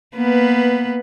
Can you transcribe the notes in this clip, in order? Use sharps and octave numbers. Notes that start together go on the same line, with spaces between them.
A#3 B3 B4